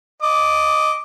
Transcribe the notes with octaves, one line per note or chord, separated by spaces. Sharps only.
D#5 D6